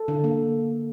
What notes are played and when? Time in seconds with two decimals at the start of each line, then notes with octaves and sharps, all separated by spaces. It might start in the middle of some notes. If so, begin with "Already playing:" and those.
Already playing: A4
0.08 D3
0.24 A#3